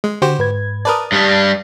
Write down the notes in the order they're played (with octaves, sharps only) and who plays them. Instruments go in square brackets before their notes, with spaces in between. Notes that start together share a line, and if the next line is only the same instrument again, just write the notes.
[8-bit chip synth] G#3
[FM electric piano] D3 [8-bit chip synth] F#4 G4 C5
[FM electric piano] G#2 B4 G#6
[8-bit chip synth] A#4 B4 D5 [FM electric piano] A5 D#6
[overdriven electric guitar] G2 G3